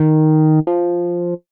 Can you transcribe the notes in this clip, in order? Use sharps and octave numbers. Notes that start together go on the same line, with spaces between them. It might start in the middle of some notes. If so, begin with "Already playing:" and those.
Already playing: D#3
F3